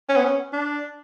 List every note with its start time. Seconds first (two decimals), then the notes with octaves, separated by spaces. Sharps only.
0.09 C#4
0.16 B3
0.25 C#4
0.53 D4